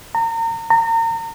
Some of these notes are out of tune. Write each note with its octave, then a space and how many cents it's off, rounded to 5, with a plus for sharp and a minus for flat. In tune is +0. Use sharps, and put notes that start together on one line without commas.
A#5 -35
A#5 -35